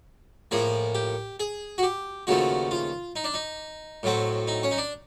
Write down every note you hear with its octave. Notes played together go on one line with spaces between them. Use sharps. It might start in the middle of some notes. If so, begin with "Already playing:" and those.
A2 F3 A#3 G#4
G4
G#4
F#4
G4
D#2 C#3 F3 A3 F#4
F4
D#4
D4
D#4
A2 F#3 A3 C4
D#4
C#4
D#4
D4